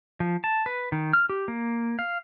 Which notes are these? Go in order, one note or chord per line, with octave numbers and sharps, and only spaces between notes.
F3
A5
B4
D#3
F6
G4
A#3
F5